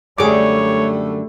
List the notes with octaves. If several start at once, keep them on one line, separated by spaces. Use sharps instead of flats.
F#2 D3 G3 A3 G#4 C#5 D6